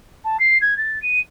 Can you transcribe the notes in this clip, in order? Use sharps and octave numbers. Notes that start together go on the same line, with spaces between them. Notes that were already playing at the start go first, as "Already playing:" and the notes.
A5
C7
G#6
A6
D#7